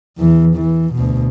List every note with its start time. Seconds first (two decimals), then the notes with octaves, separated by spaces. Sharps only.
0.18 E2 E3
0.56 E3
0.94 D2 B2